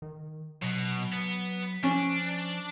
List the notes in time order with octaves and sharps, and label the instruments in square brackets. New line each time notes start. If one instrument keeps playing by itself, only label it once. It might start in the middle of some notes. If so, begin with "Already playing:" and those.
[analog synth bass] D#3
[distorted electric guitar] B2 [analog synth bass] F#3
[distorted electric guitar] B3
[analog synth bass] F3 [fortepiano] C#4 [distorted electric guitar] D4